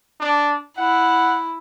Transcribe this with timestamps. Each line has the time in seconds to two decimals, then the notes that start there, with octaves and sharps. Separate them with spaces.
0.20 D4
0.77 E4 F#5